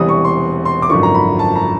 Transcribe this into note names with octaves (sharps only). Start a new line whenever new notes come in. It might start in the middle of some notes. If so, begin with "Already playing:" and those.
Already playing: E1 E2 C3 E3 G3 D#6
C#6
C6
C6
D6
G#1 F#2 D3 F3 C#6
A#5
B5
A5
A#5